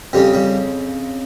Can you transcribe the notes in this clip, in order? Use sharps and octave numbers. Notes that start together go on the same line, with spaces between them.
F2 C#3 G3
G3